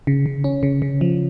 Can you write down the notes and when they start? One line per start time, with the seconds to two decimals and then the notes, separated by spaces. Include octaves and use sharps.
0.07 C#3
0.26 C#3
0.44 C#4
0.63 C#3
0.82 C#3
1.01 F3